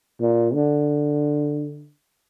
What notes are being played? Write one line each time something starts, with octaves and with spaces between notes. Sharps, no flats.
A#2
D3